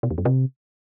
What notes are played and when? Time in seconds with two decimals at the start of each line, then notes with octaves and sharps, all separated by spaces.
0.03 B2
0.11 E2
0.18 F#2
0.25 C3